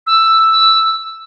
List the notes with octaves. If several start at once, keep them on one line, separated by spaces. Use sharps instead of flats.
E6